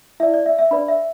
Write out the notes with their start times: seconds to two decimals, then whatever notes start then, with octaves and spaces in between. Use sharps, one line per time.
0.20 E4 D5 E5
0.34 D5
0.46 E5
0.59 E5
0.71 D4 B4 D5 B5
0.88 E5